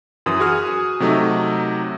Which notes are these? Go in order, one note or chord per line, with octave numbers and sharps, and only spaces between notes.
F#2 E3 D#6
F#4 G#4 D#6 F6
C3 F#3 A3 D#4